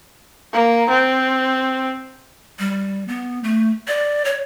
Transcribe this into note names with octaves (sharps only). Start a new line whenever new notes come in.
A#3
C4
G3
B3
A3
D5
C#5